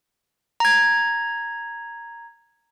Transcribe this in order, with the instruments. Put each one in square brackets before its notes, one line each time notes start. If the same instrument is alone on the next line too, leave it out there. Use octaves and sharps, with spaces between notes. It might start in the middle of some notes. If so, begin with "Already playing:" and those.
[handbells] A#5 G#6